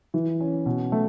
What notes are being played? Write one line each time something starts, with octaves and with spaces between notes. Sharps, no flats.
E3
C#4
B2
A3